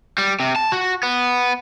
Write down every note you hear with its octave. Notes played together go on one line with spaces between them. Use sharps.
G3
C3
A5
F#4
B3